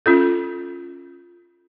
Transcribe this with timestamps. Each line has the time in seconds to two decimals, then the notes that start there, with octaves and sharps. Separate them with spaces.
0.06 C#4 F4 A4